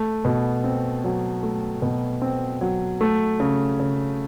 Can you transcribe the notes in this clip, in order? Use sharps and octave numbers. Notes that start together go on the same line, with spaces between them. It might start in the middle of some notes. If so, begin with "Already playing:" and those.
Already playing: A3
B2
C4
F#3
A3
B2
C4
F#3
A3
C#3
C#3